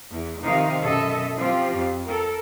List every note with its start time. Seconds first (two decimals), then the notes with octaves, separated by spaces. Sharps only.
0.11 E2
0.43 C3 D#3 F3 D#4 F5
0.84 F#2 B2 A4 D#5 E5
1.38 F3 C4 F4 G4
1.74 F2
2.06 A4 A#4